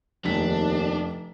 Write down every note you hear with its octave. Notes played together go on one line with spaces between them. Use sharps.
F1 D#2 D4 B6